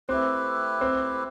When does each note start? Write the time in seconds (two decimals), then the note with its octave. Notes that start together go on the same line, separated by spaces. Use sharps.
0.09 A3 C4 E4 G4 B4
0.81 C4